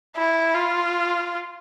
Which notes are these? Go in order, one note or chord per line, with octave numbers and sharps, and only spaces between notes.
E4
F4